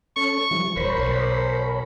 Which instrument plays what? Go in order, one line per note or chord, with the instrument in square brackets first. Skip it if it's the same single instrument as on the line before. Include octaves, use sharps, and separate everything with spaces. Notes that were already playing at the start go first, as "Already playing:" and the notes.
[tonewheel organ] C#4 A4 [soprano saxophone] C#6
[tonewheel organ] E3 F3 G3
[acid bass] D#1 [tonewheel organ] A#4 C#5 B5 [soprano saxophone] C5
[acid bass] B1